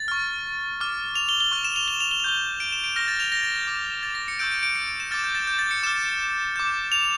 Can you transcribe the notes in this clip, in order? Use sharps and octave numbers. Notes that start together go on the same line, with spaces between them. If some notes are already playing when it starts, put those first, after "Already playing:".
Already playing: A6
C#6 F6
D6 F6
F7
G7
G7
C#6 F6
E7
F7
G7
F7
G7
F7
C#6 G6 G7
D7
E7
D7
C#6 F6 A#6
A6
F7
A#6
A6
G6
D6 G6
A6
A#6
C#7
C#6 E6 G6 D7
D7
D7
C#7
D7
E7
D6 F6 A6
G6
A6
G6
A6
C#7
D6 F6 E7
D6 G6
F7